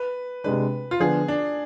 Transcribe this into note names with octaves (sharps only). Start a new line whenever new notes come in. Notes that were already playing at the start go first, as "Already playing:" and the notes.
Already playing: B4
C3 G#3 D4 B4
F4
D3 F3 B3 D4 G#4
D4